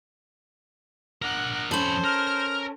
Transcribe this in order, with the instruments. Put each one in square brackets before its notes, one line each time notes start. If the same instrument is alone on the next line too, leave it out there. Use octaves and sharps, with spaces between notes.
[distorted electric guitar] D4 A#4 [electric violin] F#5 F#6
[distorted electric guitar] F2 B5 [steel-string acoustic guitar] C#4 A4 [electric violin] C5
[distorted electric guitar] A#4 [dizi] F6